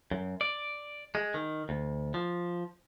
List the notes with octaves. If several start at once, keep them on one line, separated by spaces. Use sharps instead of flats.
F#2
D5
G#3
D#3
D2
F3